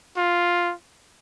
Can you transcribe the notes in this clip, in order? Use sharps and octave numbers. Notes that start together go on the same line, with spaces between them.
F4